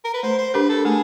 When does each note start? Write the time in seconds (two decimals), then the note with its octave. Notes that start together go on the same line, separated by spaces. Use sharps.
0.05 A#4
0.14 B4
0.23 A3 C5
0.38 C5
0.54 D4 G4 A#4 B4
0.69 A4
0.85 A3 G#4